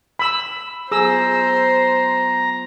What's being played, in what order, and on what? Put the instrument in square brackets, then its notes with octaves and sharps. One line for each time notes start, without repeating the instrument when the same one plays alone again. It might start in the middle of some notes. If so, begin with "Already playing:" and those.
[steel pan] B5 E6
[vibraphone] F#3 B3 F4 [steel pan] G#4 E6 [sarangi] C5 [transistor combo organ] A#5